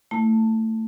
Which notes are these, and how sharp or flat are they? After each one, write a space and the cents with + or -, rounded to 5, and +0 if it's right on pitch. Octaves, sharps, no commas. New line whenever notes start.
A3 +20 E4 +0 A5 +15